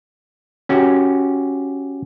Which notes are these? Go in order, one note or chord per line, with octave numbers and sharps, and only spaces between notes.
C#4 F#4 G4